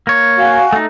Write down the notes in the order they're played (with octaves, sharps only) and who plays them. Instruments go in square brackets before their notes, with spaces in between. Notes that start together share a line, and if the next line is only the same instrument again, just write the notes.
[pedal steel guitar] A#3 C#5
[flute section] F#4 F5 G#5
[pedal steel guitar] A3 D#4